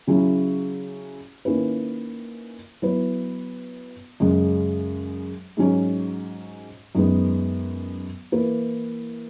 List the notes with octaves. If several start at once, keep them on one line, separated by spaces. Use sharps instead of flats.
C#3 F#3 C#4 E4
D#3 A#3 C#4 E4 B4
F#3 B3 E4 B4
F#2 C#3 G#3
G#2 F#3 C#4 G#4
F#2 D#3 G#3 B3
E3 A#3 E4 B4